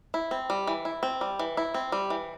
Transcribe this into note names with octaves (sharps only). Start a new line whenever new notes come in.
E4
C4
G3
E3
E4
C4
G3
E3
E4
C4
G3
E3